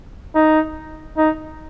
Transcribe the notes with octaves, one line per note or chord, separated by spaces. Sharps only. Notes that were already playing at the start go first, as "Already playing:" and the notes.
D#4
D#4